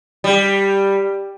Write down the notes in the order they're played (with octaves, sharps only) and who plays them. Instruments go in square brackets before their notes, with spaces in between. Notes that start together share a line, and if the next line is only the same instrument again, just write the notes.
[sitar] G3